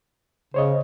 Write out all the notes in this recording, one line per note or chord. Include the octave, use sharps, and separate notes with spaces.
C#3 C5 C#5 D#5